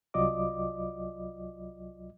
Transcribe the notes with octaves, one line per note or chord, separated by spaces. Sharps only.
C2 F#3 F4 D5 D#5 D6